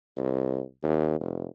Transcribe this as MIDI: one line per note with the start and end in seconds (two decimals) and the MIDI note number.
0.17 0.62 36
0.83 1.19 39
1.21 1.46 29